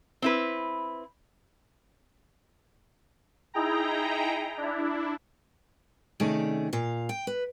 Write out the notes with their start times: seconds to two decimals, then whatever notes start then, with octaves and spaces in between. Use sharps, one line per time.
0.22 C4 E4 B4
3.54 D#4 E4 G#4 G5 A#5
4.58 D4 E4
6.20 C3 D#3 A3 C#4 G#4 D5
6.73 A#2 F4
7.09 G5
7.27 B4